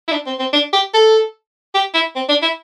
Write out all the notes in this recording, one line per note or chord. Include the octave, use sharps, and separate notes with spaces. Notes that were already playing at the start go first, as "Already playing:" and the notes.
E4
D4
C4
C4
D4
G4
A4
G4
E4
C4
D4
E4